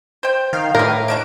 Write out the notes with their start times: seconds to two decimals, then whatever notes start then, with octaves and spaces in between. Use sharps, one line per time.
0.23 C5 G5
0.53 D#3 F5
0.75 A2 G4 A#4 B4
1.08 G#3 D4 F#4 D7